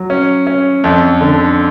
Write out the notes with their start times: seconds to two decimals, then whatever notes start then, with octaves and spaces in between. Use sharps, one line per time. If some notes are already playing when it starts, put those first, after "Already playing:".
Already playing: F#3
0.10 C#4
0.47 C#4
0.84 F2
1.21 D3